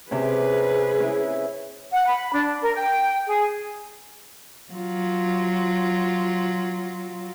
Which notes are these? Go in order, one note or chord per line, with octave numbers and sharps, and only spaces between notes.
C3 C#4 G#4 B4
C#4 E4
F#5
B5
D4
A#4
G5
G#4
F#3 F4